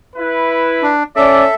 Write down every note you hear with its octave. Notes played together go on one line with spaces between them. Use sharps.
E4 B4
D4
C#4 A4 D5 E5